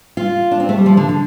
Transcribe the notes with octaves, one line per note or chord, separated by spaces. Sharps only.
F4
D4
C4
A3
G3
F3
D3
D3